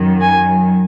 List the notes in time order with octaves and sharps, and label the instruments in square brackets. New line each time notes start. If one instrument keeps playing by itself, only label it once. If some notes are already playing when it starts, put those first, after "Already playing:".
Already playing: [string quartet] F#2 D#3 F#3
G#5